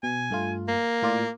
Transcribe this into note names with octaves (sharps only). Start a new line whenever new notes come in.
B2 G#5
G2 A3 F4
A#3
A2 F4 D5